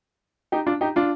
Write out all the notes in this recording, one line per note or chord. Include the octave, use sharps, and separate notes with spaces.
D#4 G4
D4 F4
D#4 G4
D4 F4